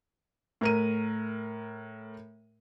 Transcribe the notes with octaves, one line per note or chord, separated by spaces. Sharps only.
A2 A#4 D#7